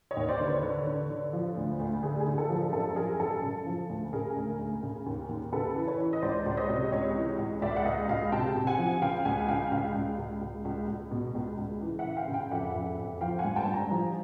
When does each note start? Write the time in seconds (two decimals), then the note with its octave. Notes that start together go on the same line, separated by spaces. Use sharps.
0.11 C#5 D#5
0.17 D#2
0.28 C5 D5
0.40 D3
0.46 B4 C#5
0.63 D3
0.87 D3
1.10 D3
1.33 F3
1.57 D2
1.80 D2
2.03 D3 G#4
2.20 G#4
2.27 D3
2.38 A4
2.50 F3
2.55 A4
2.73 F#2 A4
2.96 F3 G#4 A#4
3.20 F#2 A4
3.43 C#3
3.66 F3
3.89 D2
4.13 C#3 G#4 A#4
4.36 D2
4.59 D2
4.83 C#3
5.06 D#2
5.29 D#2
5.52 C#3 A4 B4
5.75 E3
5.88 B4 C#5
5.99 E3
6.13 D#5
6.22 C#2 C5 D5
6.46 C#2
6.51 D5
6.57 C#5 D#5
6.69 C3
6.92 C#2 C#5 D#5
7.15 E3
7.39 C#2
7.62 C#2 D5 E5
7.76 F#5
7.85 C#2 D#5 F5
8.09 C#2 D#5 F5
8.32 C3 G5 A5
8.56 C3
8.67 F#5 G#5
8.78 F3
9.01 C#3 F5 G5
9.25 C#2 F#5 G#5
9.48 C#3 F5 G5
9.72 C#2 F5 G5
9.95 C#2
10.18 C#2
10.42 C#2
10.65 C#2
10.88 C#2
11.11 B2
11.35 C#2
11.58 C#2
11.81 E3
11.99 E5 F#5
12.05 C#3
12.17 F5 G5
12.28 C#3
12.34 F5 G5
12.51 F2 E5 F#5
12.74 F2
12.98 F2
13.21 F3 F5 G5
13.39 F#5 G#5
13.45 G2
13.56 G5 A5
13.68 G2
13.74 G#5 A#5
13.91 F3